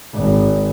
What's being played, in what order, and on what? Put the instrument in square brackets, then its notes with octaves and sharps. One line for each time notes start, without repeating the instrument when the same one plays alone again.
[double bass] G#1